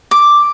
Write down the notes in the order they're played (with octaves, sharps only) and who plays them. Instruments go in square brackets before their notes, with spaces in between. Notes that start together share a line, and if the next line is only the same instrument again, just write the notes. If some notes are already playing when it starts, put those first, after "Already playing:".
[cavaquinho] D6